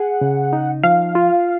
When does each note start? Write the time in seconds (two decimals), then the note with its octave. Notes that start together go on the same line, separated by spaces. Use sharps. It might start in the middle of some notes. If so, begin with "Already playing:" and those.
Already playing: G#4 F#5
0.21 C#3
0.53 D#4
0.83 F3 F5
1.15 F4